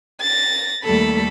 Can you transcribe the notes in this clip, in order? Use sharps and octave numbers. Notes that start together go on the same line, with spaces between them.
A6 A#6
D#2 G3 A3 A4 B5